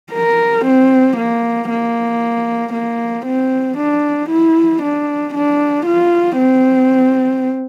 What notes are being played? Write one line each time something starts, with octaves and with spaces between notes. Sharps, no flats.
A#4
C4
A#3
A#3
A#3
C4
D4
E4
D4
D4
F4
C4